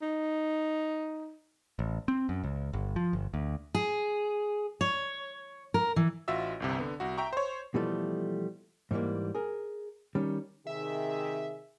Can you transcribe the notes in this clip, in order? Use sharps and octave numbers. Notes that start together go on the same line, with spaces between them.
D#4
A1
C4
F#2
C#2
G1
F3
G1
D2
G#4
C#5
A#4
E3
A1 F4 F#4 E5 E6
G1 C2 C3
D3 B3
C2 F#4
E5 G5 A#5 C#6
C5 C#5
B2 E3 F3 G3 A3 A4
G#2 E3 F3 G3 A#3
G#4 A#4
D#3 G3 C#4
C3 D#3 G#4 E5